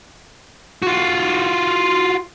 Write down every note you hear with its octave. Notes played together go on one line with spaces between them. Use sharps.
F4 F#4